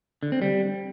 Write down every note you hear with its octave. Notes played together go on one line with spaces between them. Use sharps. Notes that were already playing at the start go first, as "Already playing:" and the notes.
D3
C4
G3